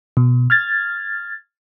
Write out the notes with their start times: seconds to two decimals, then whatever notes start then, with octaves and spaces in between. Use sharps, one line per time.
0.17 B2
0.50 F6 G#6 A6